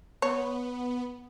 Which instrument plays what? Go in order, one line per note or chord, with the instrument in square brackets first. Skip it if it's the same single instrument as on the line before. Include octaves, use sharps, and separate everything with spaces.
[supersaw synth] B3 [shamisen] C#5